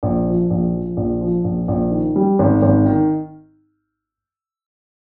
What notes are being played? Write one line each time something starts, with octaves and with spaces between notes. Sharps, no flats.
A#1
F3
A#1
F3
A#1
F3
A#1
A#1
D#3
G3
G#1
G#1
D#3